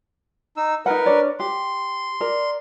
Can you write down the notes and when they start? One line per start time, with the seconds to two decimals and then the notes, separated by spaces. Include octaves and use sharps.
0.57 D#4 E6
0.86 D#4 A#4 B4 F#5
1.06 D4 C#5 D5
1.40 G4 C6
2.21 A#4 D5